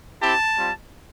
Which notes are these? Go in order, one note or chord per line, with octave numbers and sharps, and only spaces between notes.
C4 E4 G4 A5
G3 C4 F4